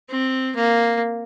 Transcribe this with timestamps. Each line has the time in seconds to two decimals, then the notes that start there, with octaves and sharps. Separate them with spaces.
0.09 C4
0.56 A#3